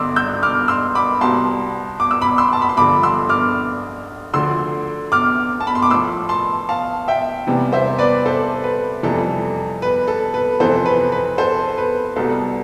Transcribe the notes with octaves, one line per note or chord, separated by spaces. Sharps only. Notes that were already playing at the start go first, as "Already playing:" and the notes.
Already playing: G2 D3 G3 C6 D6 E6
E6 G6
D6 F6
C6 E6
B5 D6
C2 B2 G3 A5 C6
D6
E6
B5 D6
C6 E6
A5
B5
C6
G2 D3 F3 B5 D6
C6 E6
D6 F6
D2 D3 F3 C6 E6
D6 F6
A5
B5
C6
D6
A2 F3 C6 E6
A5 C6
F5 A5
E5 G5
E2 C3 E3 G3
C5 E5
B4 D5
A4 C5
B4
F2 C3 E3 G3 A4
B4
A4
B4
F2 C3 E3 A4 C5
B4
B4
A4 C5
B4
C2 B2 G3 A4